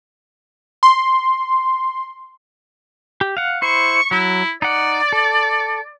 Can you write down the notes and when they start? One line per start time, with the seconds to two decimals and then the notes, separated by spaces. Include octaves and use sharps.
0.83 C6
3.21 G4
3.37 F5 F#5
3.62 E4 C5 C#6
4.11 F#3 E4
4.62 D#4 D5 F#5
5.13 A4